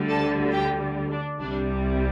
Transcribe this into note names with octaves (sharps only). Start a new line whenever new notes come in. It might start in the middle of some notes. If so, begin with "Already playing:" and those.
Already playing: D2 D3 G3
A4 A5
G4 G5
D4
C2 C3 G3 D4